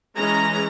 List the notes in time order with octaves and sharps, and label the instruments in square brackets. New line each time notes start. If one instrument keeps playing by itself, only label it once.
[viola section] E3 G#3 C#4 A#5